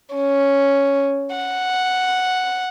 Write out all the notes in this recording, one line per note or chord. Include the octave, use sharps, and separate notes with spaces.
C#4
F#5